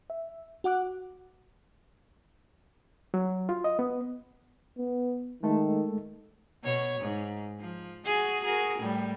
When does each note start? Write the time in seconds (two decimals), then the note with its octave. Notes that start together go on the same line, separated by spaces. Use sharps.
0.10 E5
0.64 F#4 F#5 D6 F#6
3.14 F#3
3.49 F4
3.64 D#5
3.79 B3
4.78 B3
5.43 D#3 G#3 A3 A4
6.64 B2 C#5
7.00 G#2
7.60 F3
8.06 F#4 G#4
8.44 F#4 G#4 A#4
8.79 A2 G3